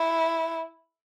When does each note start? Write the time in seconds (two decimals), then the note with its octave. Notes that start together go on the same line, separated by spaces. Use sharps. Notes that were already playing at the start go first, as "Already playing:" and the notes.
Already playing: E4